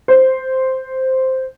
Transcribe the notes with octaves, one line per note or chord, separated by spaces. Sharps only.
C5